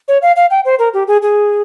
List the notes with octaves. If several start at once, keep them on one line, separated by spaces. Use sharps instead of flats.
C#5
F5
F5
G5
C5
A#4
G4
G#4
G#4